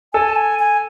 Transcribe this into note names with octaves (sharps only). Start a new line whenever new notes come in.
A4 G#5
A5
G#5
G#5